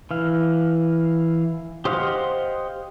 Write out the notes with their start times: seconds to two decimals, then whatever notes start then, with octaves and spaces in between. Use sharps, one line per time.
0.11 E3 F5
1.85 G4 C5 D#5 F5 F#5